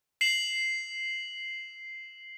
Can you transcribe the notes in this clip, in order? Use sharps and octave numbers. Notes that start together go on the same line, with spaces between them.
C7 E7 F#7